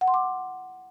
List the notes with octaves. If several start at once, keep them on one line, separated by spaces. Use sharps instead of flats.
F#5
C6
D6